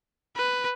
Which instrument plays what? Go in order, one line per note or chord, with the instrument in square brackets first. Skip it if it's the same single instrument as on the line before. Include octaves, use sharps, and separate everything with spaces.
[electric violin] B4